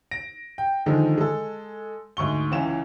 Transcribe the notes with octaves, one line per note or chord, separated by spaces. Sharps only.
A#6 D7
G5
D3 D#3 F3 G#3 D#4
G#3 A4
D2 G#2 C#6 G7
C#2 E3 C#4 E7